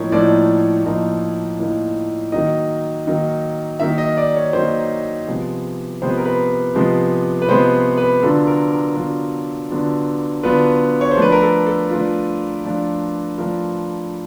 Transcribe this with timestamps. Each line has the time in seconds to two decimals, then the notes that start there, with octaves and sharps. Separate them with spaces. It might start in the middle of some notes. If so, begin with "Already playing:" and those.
Already playing: A2 F3 A#3 D#4 C#5
0.12 A2 F3 A#3 D#4 D5
0.85 A2 F3 A#3 D#4
1.59 A2 F3 A#3 D#4
2.32 D#3 F#3 A#3 D#4 D#5
3.07 D#3 F#3 A#3 D#4
3.80 D#3 F#3 A#3 D#4 E5
3.98 D#5
4.17 D5
4.36 C#5
4.53 D#3 F#3 A#3 D#4 C5
5.28 C3 F3 G#3 B3
6.02 C3 F3 G#3 B3 C5
6.09 B4
6.17 A#4
6.25 B4
6.75 C3 F3 G#3 B3
7.42 B4
7.48 C3 F3 G#3 B3 C5
7.97 B4
8.23 D3 F#3 B3 D4 F4 A4
8.47 A#4
8.72 A#4
8.95 D3 F#3 B3 D4 F4
9.70 D3 F#3 B3 D4 F4
10.43 D3 F#3 B3 D4 F4 B4
11.01 C#5
11.11 C5
11.17 F3 A3 D4 F4 B4
11.32 A#4
11.42 A4
11.66 A4
11.90 F3 A3 D4 F4
12.65 F3 A3 D4 F4
13.38 F3 A3 D4 F4 A#4